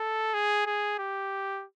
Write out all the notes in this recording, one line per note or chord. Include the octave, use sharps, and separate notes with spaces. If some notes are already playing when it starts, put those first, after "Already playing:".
Already playing: A4
G#4
G#4
G4